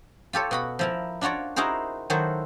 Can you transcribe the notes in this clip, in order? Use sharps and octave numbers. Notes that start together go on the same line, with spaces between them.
F4 G4 A4 C#5
B2 F#4 B5
F3 E4 A#4
D4 F4 F#4 C#5 D5
D#4 E4 F#4 G#4 A#4 C5
D#3 F#3 E4 F#4 A4 C5